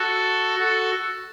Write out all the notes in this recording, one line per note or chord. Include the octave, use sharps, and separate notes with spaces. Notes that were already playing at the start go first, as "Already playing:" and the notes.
Already playing: F#4 A4
F#4 A4